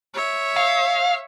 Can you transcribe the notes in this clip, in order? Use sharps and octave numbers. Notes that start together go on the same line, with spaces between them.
C#5 E5
F5